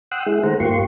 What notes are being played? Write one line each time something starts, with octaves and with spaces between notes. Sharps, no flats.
F#5 G5 C6 D#6 E6 F#6
G#3 E4 G#4
D#3 A3 C5 F#5 A#5
G2 A#3 F4 G4 C6 C#6